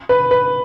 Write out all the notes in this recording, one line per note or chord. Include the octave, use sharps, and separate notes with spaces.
B4
B4